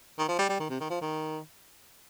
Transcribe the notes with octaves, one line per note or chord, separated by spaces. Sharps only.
D#3
F3
G3
G3
D#3
C3
D#3
F3
D#3